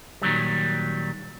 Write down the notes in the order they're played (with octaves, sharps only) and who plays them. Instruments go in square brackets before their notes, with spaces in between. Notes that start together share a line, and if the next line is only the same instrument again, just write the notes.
[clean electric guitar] A#2 D#3 F#3 G3